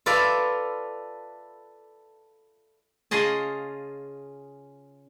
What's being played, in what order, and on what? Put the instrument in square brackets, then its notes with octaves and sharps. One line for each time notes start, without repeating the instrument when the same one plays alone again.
[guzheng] F4 A4 B4 D5 E5 F5
[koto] C#3 F4 G#4 D#5 A5